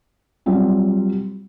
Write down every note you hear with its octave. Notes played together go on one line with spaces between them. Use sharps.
F#3 G3 C4 F4